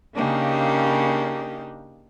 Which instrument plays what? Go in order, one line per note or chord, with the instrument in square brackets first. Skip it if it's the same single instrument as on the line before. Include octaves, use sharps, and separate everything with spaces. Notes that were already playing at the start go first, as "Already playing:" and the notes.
[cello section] C#3 A#3 [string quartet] D4 D#4 G4